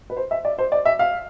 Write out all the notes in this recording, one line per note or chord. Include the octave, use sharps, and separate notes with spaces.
B4
C5
E5
D5
C5
D5
E5
F5